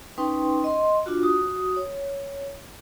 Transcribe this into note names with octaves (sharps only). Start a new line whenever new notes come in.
C#4 D#4 B4 G5 C6
D#5 C6
D4 F4 F#4
F#4 D#6
C#5